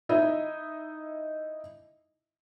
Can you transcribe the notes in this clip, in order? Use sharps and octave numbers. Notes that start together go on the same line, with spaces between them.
D#4 E4 D#5 E5